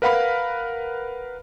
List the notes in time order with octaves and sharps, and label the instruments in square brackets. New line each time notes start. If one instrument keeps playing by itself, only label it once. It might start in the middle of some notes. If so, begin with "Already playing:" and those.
[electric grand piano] A#4 B4 F5 F#5 B5